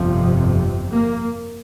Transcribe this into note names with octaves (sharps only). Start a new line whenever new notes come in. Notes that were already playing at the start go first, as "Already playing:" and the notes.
Already playing: G1 F2 C3 F3
A#3